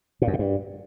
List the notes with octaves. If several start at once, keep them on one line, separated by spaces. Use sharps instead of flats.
A#2
F#2
B2
G2